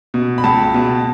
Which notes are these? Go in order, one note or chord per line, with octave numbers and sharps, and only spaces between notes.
B2
B5
C#2 A5
B2